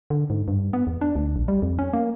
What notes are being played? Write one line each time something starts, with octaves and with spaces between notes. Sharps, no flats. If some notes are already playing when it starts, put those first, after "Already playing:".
D3
G#2
G2
B3
E2
D4
D2
A#1
G3
F2
C#4
A#3